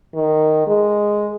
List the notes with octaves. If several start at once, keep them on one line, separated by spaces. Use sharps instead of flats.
D#3
G#3